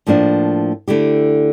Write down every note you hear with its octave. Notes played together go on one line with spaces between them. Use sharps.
A2 F3 A#3 D4
D3 A3 E4 G4